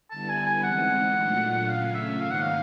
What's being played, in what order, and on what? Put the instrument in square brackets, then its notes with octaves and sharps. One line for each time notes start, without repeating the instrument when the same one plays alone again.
[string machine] D3 G3 B3 E4 [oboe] A5
[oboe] G#5
G#5
[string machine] E3 G#3 C4 D#4 [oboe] F#5
[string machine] A#2 F#3 A3 D4 F4
[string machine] C#3 F#3 A3 C#4 F4 [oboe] F5
[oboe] E5
[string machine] G#2 D#3 F#3 A#3 D#4 [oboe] F5
[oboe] F#5
F5